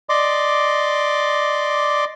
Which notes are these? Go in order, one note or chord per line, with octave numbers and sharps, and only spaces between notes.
D5 D#5 C6 D6